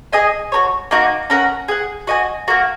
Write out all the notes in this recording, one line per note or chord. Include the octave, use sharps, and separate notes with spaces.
G#4 D#5 G#5
F#4 A#4 C#5
A#3 D#4 F#4
C#4 A#4 F#5
G#4 F#5
F#4 D#5 G#5
A#3 F#4 A#4